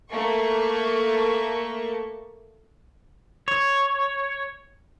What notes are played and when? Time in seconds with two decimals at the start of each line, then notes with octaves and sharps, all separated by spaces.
0.12 A3 A#3 C#6
3.48 C#5